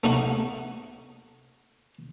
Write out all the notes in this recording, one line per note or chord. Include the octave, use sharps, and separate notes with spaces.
A3 D#4 F#4 F#5